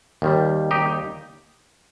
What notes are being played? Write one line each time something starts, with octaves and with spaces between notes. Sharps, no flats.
D#2 D#3 G3
D#4 G4